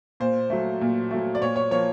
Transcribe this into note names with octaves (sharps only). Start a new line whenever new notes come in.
A#2 C5
F#3 A3
A#2
F#3 A3
D5
A#2 C#5
C#5
F3 A#3 C#5